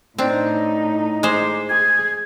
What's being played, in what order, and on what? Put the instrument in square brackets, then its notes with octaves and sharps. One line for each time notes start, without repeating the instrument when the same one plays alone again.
[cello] A2 D#4 [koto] C4 D4
[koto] G#3 C5 [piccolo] D6
[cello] G#4 [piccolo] G#6